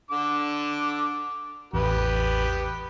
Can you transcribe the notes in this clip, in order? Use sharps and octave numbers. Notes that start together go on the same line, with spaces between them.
D3 D6
A1 E2 B3 G4 B4